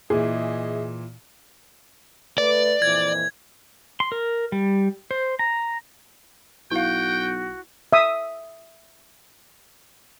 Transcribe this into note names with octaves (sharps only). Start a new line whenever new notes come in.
A#2 E3 G#4 D#5 E5
A3 B4 D5
F2 A#2 E3 G#6
C6
A#4
G3
C5
A#5
B1 E4 F#4 F5 G5
E5 D#6